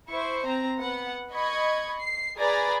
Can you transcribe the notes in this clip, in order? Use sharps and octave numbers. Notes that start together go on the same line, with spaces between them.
E4 C5 C#6
C4 A#5
B3 F#5
D#5 B5 C#6 G#6
C7
G#4 B4 D5 G#5 A#5 B5